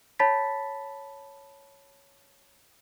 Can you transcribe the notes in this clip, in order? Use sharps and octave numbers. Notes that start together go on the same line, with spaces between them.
C#5 A5 B5 A6 B6